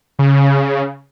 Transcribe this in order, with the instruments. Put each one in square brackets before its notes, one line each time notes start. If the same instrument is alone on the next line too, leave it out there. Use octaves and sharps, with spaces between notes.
[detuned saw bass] C#3